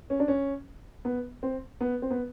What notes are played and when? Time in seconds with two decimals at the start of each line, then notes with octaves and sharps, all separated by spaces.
0.10 C#4
0.20 D4
0.28 C#4
1.05 B3
1.43 C4
1.81 B3
2.02 C4
2.11 B3